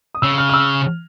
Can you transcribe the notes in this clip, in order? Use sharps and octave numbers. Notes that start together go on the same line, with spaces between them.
D#6
C#3 E6
F6
F6
E6